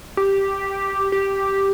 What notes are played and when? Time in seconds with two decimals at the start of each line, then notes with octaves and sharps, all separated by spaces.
0.17 G4
1.12 G4